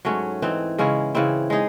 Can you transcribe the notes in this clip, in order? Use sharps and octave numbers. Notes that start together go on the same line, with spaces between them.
G#2 F#3 A3 C#4
E3 C4 D#4
C#3 G#3 C#4 E4
C#3 E3 C4 E4
G#3 D#4 G#4